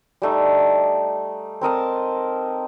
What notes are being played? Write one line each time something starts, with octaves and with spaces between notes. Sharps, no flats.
G3 A3 D#4
C4 A#4 D#5 A5